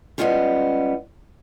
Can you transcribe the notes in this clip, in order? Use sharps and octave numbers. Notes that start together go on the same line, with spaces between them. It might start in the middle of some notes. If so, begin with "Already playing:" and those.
G3 G#3 B3 C#4 F4 G4